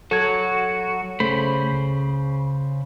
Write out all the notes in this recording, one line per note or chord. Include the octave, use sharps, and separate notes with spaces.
F#3 F#4 A4 G#6
C#3 A3 C5 B5
C#2